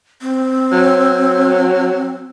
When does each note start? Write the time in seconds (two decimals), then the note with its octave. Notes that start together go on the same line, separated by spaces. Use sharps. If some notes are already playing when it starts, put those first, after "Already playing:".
0.22 C4
0.72 F#3